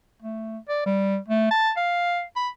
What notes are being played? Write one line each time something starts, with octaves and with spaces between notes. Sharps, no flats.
A3
D5
G3
A3
A5
F5
B5